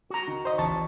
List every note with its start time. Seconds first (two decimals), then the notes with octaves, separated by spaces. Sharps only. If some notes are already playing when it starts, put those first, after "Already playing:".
0.10 F#4 A#5
0.27 D#3
0.45 C5 D#5
0.58 A1 E2 A5 C#6